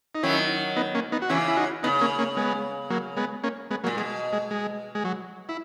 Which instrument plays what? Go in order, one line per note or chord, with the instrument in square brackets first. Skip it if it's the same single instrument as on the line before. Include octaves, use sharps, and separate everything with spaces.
[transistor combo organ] D#4
[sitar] D#3 F#3 [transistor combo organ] C#4 E4
[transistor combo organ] B3 D#4
A#3 C#4
B3 D#4
F#4
[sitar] C#3 E3 [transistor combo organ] C#4 E4
[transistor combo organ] E4
D#4 F#4
[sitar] C#3 [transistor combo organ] B3 D#4
[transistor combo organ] A#3 C#4
A#3 C#4
G#3 B3
F#3 A#3
G#3 B3
A#3 C#4
G#3 B3
[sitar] A#2 [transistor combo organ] F#3 A#3
[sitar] B2 [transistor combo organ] G#3
[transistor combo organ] G#3
G#3
G#3
F#3
E4